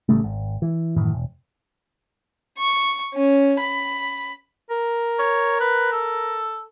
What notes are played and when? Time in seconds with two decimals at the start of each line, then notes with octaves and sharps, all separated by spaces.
0.09 A1 C#3 G3 A3
0.24 G#1
0.62 E3
0.97 F#2 A2 D#3 E3
1.13 E1
2.58 C#6
3.14 C#4
3.60 B5
4.70 A#4
5.19 C#5
5.60 B4
5.92 A4